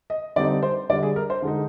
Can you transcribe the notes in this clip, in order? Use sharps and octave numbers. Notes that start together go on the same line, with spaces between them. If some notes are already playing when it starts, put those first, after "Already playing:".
D#5
D3 G3 C4 D#4 D5
C5
D3 G3 D4 D5
G#4
A#4
C5
D3 G#3 D#4